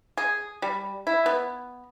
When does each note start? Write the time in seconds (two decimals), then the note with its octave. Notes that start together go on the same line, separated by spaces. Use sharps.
0.17 G#4
0.62 G3
1.07 E4
1.26 B3